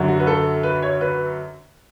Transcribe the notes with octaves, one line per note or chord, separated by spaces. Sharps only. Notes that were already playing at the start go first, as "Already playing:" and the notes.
Already playing: F#2 D3 F#3
F#4
B4
A4
B4
C#5
B4